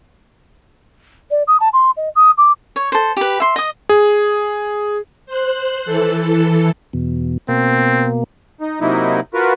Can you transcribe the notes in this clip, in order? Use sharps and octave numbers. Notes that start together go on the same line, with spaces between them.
D5
D#6
A5
C6
D#5
D#6
D6
C#5
A4 C5
G4 B4
E5 C6
D#5 D#6
G#4
C5 F#6
E3 A4
E2 B2
B2 A#3 C4
D#4
C3 F#3 A#3 D#4 E4
F4 F#4 A#4 B4